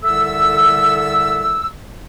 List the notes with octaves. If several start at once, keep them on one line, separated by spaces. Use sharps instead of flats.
C2 D3 A4 E5 E6